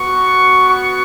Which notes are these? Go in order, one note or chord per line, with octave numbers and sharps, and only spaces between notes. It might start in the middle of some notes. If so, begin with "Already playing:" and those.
Already playing: B3 F#4 C#6
C#6